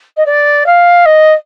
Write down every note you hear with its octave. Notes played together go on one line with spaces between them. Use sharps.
D#5
D5
F5
D#5